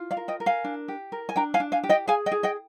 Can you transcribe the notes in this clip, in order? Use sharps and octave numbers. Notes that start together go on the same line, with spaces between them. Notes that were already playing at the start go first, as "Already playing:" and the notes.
Already playing: F4
D5 F5
A#4
D#5 G5
A#4
F5 G#5
D4
G4
A#4
G#5
D4 G5 A#5
F5 G#5
D4
F5 G#5
G4
D#5 G5
G#4 F5 G#5
D#5 G5
G#4
D#5 G5